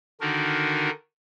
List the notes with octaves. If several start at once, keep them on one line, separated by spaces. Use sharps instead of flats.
D3 D#3 D4 D#4 F#4 A#4